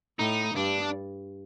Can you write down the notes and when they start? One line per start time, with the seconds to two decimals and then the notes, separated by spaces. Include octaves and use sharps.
0.18 A2 D#4
0.55 G2 D4